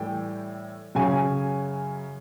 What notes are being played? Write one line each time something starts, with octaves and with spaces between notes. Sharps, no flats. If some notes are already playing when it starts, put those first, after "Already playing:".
Already playing: A2 E3 G3 G5
F#2 C#3 F#3 G#5